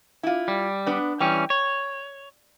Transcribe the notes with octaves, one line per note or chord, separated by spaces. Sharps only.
E4 F4
G3
B3 D4
E3 G3 C#4 G5
C#5